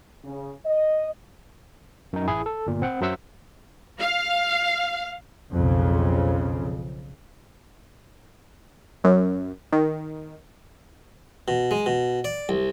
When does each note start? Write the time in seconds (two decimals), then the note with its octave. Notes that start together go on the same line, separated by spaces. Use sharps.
0.25 C#3
0.65 D#5
2.13 F#2 D#4
2.27 A1 E4 G#4
2.46 A4
2.67 G1 A#2
2.82 C4 F#5 G5
3.01 F#2 F#3 C5 E5 F#5 E6
3.99 F5
5.54 B1 F2 C#3
9.04 F#2
9.72 D#3
11.48 B2
11.71 G#3
11.86 B2
12.25 D5
12.49 C2